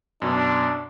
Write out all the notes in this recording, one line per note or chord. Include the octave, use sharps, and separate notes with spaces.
F#2 B2 D4